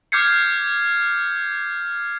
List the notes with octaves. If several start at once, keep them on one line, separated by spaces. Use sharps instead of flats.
D6 F6 G6 G#6 C7 C#7